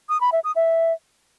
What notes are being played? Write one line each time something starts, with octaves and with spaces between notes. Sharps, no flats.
D#6
B5
E5
D#6
E5